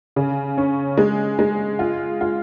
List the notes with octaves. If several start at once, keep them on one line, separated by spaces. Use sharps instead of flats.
C#3
C#4
G#3
G#3
F4
F4